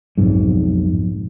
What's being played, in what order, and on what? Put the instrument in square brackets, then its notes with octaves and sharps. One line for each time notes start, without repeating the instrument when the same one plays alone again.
[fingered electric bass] B1 F2 G#2